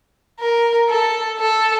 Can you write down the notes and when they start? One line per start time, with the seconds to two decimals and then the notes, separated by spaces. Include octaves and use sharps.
0.40 A#4
0.90 A4
1.39 A4